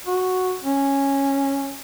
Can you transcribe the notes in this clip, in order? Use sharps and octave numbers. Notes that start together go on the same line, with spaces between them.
F#4
C#4